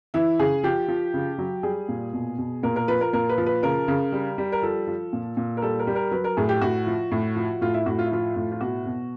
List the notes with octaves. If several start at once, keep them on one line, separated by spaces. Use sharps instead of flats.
E3 E4
C#3 G#4
F3 G4
F3
C#3
F#3
G3 G#4
A#2
B2
B2
A#2 A#4
A#4
F3 B4
A#4
A#2 A#4
B4
F3
B4
C#3 A#4
C#3
G3
G3
A#4
F3 A4
F3
A#2
A#2
A#4
G3 A4
A#4
G3
A#4
F#3 B4
A#4
A2 G#4
G4
A2 F#4
F3
A2
F3
A2 F4
E4
A2 F#4
F4
E4
F3 F4
A2
F4
B2 F#4
B2